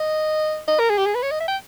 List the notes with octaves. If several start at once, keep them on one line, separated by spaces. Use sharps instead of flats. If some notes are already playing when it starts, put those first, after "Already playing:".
Already playing: D#5
D#5
A#4
G#4
G4
G#4
B4
C#5
D#5
E5
G5